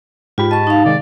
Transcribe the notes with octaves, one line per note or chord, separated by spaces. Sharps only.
G#2 F4 G4 B5
D#5 A5 C#6
D#4 F5
C3 D#3 G#3 D5